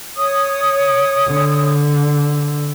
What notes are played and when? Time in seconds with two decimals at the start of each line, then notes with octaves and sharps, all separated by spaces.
0.16 C#5 D#6
1.28 D3